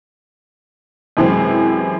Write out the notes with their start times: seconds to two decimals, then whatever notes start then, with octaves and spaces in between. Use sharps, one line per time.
1.17 F#2 C3 E3 G#3 C4